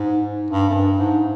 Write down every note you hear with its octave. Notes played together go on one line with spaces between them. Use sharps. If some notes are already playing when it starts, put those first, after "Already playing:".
Already playing: G#2
G2
F#2
G2
G#2